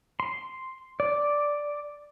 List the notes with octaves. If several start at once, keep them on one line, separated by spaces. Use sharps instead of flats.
C6
D5